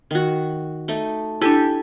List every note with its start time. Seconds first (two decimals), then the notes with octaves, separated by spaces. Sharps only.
0.11 D#3 F#4
0.88 A3 D#4
1.41 D4 E4 G4 A4 G#5